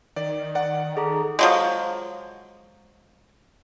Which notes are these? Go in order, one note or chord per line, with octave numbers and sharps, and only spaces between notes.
D#3 D5
D5 F#5
G#4 A4 A#5
F3 F#3 G#3